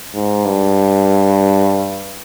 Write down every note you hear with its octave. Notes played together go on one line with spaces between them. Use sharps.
G#2
G2